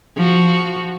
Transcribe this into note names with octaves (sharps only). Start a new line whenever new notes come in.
F3 F#4